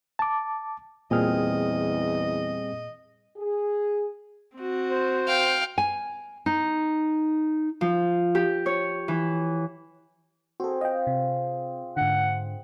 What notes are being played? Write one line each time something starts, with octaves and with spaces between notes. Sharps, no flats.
A5 D6
E2 A#2 G3 C4 G#4 D#5 F6
G#4
C4 F#4
C5
F5 G5
G#5
D#4
F3
G4
C#5
E3
C4 F#4 G#4 A4
F4 D#5 G5
C3
G#2 D3 F#5